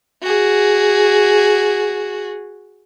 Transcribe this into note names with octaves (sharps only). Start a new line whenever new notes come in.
F#4 G#4